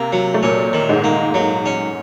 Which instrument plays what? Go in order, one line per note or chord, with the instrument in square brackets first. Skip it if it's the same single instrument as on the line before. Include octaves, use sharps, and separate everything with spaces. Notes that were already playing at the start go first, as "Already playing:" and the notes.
Already playing: [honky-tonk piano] C3 [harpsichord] A#3
[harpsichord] F#3
[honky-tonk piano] A3
[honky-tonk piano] A#2 A#3 [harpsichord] C#4
[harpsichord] D#3
[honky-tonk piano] G#2 G#3
[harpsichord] A#3
F#3
C#4